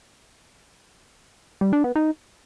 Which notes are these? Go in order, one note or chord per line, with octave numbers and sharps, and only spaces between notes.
G3
D4
B3
D#4